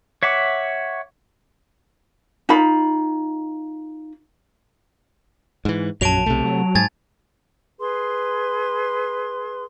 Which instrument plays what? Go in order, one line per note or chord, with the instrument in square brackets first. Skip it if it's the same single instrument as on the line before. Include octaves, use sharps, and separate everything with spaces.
[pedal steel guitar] C#5 E5 F#5 D6
[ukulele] D#4 F4 B5
[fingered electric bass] G#2 E3
[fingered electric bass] A#1 F#3 [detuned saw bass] F#2 [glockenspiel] A5 D7 F7
[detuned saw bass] B1 [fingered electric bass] C3 A3
[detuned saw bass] F#3
[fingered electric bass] G#2 [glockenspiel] G#5 G#6 A6
[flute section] G#4 B4 C6